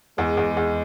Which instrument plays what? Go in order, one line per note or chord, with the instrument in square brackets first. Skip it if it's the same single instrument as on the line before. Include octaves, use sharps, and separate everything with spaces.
[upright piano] E2 [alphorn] G#3
[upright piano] E2
E2